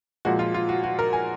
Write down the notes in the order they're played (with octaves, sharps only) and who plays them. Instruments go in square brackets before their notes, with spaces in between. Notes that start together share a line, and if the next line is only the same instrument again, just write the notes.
[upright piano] A#2 F3 G#3 F#4
F4
F4
F#4
F#4
A#4
G#5